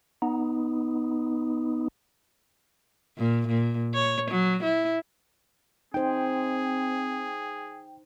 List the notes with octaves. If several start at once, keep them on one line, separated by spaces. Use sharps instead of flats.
B3 D#4
A#2
A#2
C#5
F#3
E4
C4 D#4 G#4 C5 G5